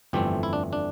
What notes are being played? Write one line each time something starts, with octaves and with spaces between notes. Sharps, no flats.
G1 F2 E3 A3 C4 G4
E4
D4
D4